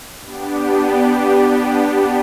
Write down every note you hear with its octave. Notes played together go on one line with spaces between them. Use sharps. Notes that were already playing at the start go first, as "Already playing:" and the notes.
B3 D4 G4